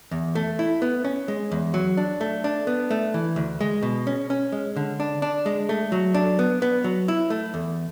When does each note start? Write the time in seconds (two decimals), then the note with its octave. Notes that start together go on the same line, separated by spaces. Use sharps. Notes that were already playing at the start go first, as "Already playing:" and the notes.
0.11 E2
0.35 A3
0.59 E4
0.82 B3
1.05 C#4
1.28 G#3
1.52 E2
1.74 F#3
1.97 D4
2.21 A3
2.44 D4
2.67 B3
2.90 A3
3.14 E3
3.36 D2
3.61 G#3
3.83 B2
4.07 C#4
4.30 C#4
4.52 G#3
4.76 D3
5.00 D4
5.22 D4
5.46 G#3
5.69 A3
5.92 F#3
6.14 D4
6.39 B3
6.62 B3
6.84 F#3
7.08 E4
7.30 A3
7.54 E2